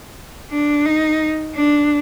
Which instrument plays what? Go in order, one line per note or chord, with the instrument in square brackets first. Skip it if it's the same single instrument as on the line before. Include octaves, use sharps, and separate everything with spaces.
[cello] D4
D#4
D4